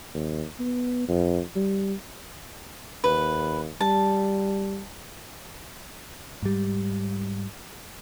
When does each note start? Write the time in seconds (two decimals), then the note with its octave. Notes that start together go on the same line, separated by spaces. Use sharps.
0.15 D#2
0.60 B3
1.08 F2
1.56 G3
3.04 D#2 B4
3.81 G3 A5
6.42 G#2 G3